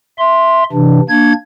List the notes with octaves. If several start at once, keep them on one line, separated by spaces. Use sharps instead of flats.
E5 C6
C3 E3 D4
A#3 D4 G#6